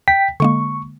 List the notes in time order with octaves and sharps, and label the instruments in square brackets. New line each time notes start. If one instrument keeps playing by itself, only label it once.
[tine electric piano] G5 B6
[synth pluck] D3 G#3 A#3 [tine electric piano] C#6